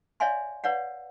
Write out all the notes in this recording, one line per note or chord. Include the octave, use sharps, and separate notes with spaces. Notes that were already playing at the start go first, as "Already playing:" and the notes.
C#5 D5 E5 F5 G#5 C6
B4 C#5 D5 F5 F#5